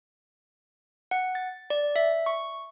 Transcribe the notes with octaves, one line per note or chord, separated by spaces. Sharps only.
F#5
A6
D5
E5
C#6